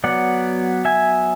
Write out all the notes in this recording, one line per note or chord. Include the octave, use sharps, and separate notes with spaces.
F#3 B3 D5 F#5
E5 G#5